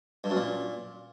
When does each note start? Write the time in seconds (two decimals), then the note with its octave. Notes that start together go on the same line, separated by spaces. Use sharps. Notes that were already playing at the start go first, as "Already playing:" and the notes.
0.24 G2
0.30 F#2
0.36 A#2